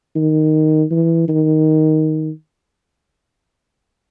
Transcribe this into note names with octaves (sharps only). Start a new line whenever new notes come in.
D#3
E3
D#3